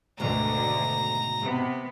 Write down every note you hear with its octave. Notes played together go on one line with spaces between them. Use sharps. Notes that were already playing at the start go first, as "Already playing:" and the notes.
D2 G#2 B2 D3 D#3 A#5
C3 B3